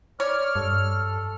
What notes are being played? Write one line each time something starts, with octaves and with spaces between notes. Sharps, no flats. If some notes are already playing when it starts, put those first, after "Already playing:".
C#5 D5 F6
G2 A4